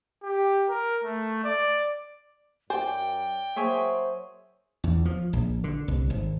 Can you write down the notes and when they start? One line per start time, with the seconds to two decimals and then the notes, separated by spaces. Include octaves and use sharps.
0.23 G4
0.69 A#4
1.04 A3
1.44 D5
2.70 F#2 C5 D5 G5 G#5
3.56 F#3 A#3 G#4 C5 C#5 E5
4.84 E2
5.05 F3
5.33 A#1
5.64 D3
5.88 C2
6.10 G#1